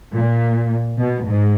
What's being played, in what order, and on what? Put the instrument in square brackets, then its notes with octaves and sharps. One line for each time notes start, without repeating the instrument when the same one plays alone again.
[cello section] A#2
B2
G#2